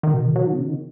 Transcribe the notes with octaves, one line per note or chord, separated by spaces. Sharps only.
D#3
B2
D#3
F#3
D#3
B2
C#3
D#3